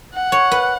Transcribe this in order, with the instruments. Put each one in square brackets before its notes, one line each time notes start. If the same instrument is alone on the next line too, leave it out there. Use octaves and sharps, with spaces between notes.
[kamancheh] F#5
[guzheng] C#5
B4